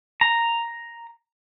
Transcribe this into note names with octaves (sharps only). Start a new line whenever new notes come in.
A#5